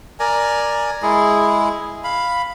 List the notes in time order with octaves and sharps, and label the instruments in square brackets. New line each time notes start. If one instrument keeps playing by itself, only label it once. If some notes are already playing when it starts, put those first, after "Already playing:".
[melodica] A#4 D5 G#5 A#5
G#3 E4 G#4
F5 B5